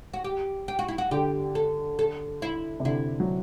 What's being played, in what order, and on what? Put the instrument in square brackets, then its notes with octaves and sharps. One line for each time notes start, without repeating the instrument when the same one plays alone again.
[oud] F#4
G4
G4
F#4
E4
F#4
[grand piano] D3 [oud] G4
[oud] A4
A4
E4
[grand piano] C3
[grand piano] D3 [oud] E4
[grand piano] F#3